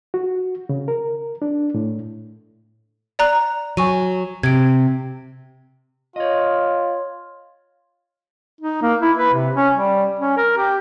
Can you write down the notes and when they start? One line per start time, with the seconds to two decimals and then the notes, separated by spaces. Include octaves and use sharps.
0.14 F#4
0.69 C#3
0.88 A#4
1.42 D4
1.74 A2
3.19 D5 A#5 F#6
3.77 F#3 G#5 C#6 D#7
4.43 C3 G#6 D7
6.16 F4 C#5 D#5
8.61 D#4
8.82 A#3
9.02 E4
9.18 B4
9.33 C3
9.56 C#4
9.74 G3
10.20 C#4
10.37 A#4
10.58 G4